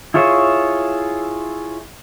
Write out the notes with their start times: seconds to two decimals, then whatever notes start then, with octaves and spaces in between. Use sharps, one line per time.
0.14 E4 F4 G#4 C#5 E5